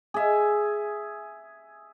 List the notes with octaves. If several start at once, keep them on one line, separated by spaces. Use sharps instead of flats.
G#4 E5